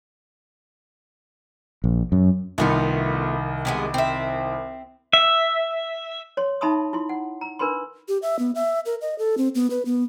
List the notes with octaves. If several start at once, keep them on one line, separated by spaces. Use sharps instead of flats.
A#1
F#2
C2 D#3 A3 B3 F4
C3 G#3 B3
C4 E5
E5
C#5 C6
D#4 E5 A5 B5 C6 D#6
E4 F4 C6
F#5
A#5
D4 A#4 B4 B5 C6
G4
E5
B3
E5
A#4
D#5
A4
C4
B3
B4
B3